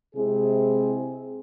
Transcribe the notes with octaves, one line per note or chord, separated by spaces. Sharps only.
C3 G#3 C4 E4 G#4